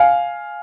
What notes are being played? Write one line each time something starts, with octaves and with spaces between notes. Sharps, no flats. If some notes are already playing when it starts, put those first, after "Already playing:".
Already playing: F5 G#5